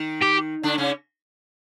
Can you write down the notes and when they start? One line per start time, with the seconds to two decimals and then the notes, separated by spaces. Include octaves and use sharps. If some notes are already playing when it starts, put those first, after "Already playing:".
Already playing: D#3 D#4
0.22 G4
0.63 D3 D4
0.78 C#3 C#4